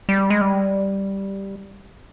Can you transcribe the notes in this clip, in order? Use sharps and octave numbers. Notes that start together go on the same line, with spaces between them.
G3
G#3
G3